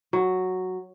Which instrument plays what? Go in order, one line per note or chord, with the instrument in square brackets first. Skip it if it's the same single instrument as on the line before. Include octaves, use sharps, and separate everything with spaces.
[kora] F#3